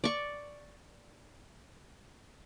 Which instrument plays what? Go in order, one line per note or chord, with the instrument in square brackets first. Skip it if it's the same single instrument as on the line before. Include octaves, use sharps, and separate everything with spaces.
[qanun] D5 C#6